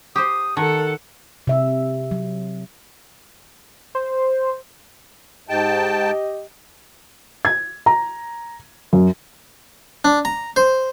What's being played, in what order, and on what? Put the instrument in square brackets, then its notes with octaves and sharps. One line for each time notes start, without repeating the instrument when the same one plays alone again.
[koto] G4 C5 [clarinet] D#6
[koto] D#3 [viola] A4 F#5 [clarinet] A5
[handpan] C3 E5
F#3
[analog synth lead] C5
[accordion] G#2 G5 A5 [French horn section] G4 D#5
[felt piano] G#6
A#5
F#2
[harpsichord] D4
A#5
C5